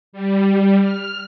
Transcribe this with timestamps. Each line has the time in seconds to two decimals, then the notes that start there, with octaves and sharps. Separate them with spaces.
0.12 G3
0.81 F6